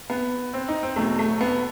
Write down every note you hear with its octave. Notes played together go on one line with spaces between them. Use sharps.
B3
C4
D#4
C4
E2 B2 F#3 A3
A3
B3